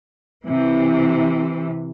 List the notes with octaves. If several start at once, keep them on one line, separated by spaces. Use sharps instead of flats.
C3 E3